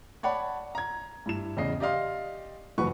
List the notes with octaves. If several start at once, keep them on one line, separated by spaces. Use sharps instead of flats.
C#5 D5 F#5 A5 B5
A#5 G#6
G2 E4 E7
E2 C#3 D#5 C7
G4 D5 D#5 F5 C6
F#1 E3 F#4 B4 C#6